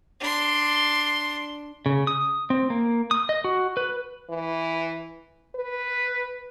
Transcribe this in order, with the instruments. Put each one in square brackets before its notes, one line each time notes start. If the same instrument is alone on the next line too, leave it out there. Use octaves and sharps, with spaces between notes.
[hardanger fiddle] D4 C6
[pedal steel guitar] C#3
D#6
C4
A#3
D#6
D#5
F#4
B4
[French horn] E3
B4